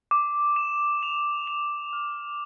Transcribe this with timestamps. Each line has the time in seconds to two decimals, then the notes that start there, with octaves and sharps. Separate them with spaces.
0.11 D6
0.56 E7
1.03 F7
1.47 F7
1.93 F6